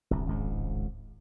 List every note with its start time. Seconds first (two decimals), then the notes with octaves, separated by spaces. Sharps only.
0.11 D1 G1 C2
0.27 G#1 C#2 G#2